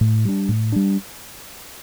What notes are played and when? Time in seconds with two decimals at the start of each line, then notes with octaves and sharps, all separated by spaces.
0.01 A2
0.25 G3 D4
0.49 A2
0.72 G3 D4